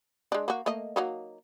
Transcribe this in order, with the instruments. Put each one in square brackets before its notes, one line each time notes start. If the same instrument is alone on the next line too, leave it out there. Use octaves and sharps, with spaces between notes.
[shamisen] G#3 D4
A#3 F#4
A3 A#3 D#5
F#3 A#3 D#4